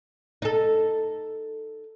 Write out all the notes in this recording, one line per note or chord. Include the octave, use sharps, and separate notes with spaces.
D#4 A4